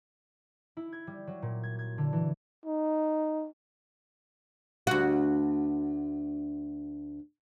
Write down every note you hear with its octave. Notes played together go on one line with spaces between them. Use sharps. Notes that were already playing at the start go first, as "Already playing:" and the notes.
E4
G#6
G3
F#3
A#2
G#6
G#6
D3
E3
D#4
D2 F#4